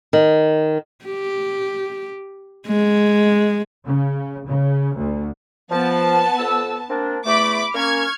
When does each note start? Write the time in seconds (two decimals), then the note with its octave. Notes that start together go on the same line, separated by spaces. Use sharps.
0.13 D#3
1.05 G4
2.67 G#3
3.85 C#3
4.47 C#3
4.97 D2
5.71 F3 B3 A5
6.39 F2 E6
6.90 A#3 C4 D4
7.26 E2 A3 B5 D6
7.75 A#3 C#4 C#6 F6 G#6